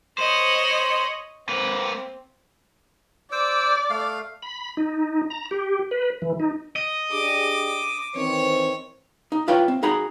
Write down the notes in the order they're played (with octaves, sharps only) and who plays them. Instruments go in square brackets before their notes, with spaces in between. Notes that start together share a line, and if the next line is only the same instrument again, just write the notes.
[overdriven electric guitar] C5 [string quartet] C#5 D#5 B5
[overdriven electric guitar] A#3 B4 [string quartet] C4
[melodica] C5 D6 E6 [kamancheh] D5
[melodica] A3 F5
[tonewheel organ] B5
D#4
A#5
G4
B4
E3
D#4
[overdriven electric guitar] D#5
[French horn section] D4 G4 G#4 [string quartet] D6
[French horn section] D#3 E3 C4 [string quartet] C#5
[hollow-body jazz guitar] D#4
E4 F4 B4 C#5 G5
C4
D#4 F#4 G#4 A#5 B5